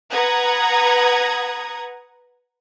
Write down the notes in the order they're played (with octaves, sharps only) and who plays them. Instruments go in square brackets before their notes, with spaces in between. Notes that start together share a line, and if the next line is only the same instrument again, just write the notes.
[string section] B4 F#5 A#5 D#6 G#6